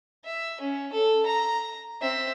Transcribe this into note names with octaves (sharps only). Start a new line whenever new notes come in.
E5
C#4
A4
A#5
C4 E5